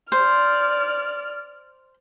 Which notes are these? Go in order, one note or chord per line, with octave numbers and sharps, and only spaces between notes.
C5 D5 F6